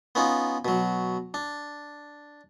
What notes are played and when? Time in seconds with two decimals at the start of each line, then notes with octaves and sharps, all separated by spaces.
0.15 B3 C#4 D#4 F4
0.65 B2 F#3
1.34 D4